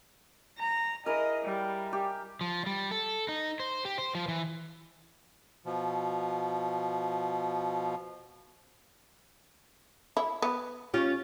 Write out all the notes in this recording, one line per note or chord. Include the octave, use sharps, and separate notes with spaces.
A#5
E4 G#4 A#4 D#5
G3
G4
F3
G3
A4
D#4
C5
G4
C5
F3
E3
B2 F3
E4
B3
C#4 F4 G4